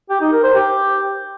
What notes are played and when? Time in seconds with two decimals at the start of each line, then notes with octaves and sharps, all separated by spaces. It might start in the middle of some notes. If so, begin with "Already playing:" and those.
0.10 G4
0.21 D#4
0.32 A#4
0.43 C5
0.55 G4